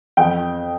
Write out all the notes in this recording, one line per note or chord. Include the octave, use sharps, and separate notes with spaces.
F2 G5